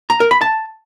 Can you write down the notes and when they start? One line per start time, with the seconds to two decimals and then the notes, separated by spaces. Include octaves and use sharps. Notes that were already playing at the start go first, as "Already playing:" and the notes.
0.10 A#5
0.20 A#4
0.31 B5
0.41 A5